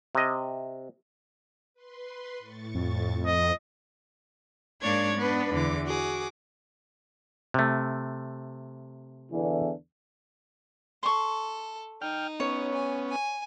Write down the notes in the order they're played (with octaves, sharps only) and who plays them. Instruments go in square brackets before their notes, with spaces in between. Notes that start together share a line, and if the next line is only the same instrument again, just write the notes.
[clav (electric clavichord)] C3 D#5
[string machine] B4 C6
A2 C#6 A6
[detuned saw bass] F2
[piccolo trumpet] D#5
[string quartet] G#2 A#3 D4 C#5 D5 G#6
B3 D4 B4
E2 D3 E3 D6
F#4 G#4 D6
[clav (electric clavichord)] C3 A3
[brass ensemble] E2 D3 E3
[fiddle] A4 [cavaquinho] C6 C#6
[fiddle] D#4 [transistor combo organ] G5 F6
[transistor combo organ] B3 C#4 [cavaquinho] C#5
[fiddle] G#5
G#5